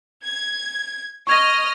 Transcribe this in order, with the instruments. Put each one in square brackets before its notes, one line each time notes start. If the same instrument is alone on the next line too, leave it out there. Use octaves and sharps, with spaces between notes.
[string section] G#6
[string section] D#5 F6 [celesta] C#6 G#6 A#6